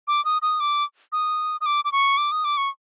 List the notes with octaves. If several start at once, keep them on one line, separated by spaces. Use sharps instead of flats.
D6
D#6
D#6
D6
D#6
D#6
D6
D6
C#6
D6
D#6
D6
C#6